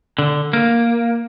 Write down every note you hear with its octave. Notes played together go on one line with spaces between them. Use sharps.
D3
A#3